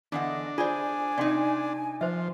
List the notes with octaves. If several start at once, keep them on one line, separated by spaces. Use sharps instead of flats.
E2 D3 D4 D#5 F#5
F4 G#4 C5 D5 G#5
C3 D#4 D5 G5 C6
F3 C5 E5 C6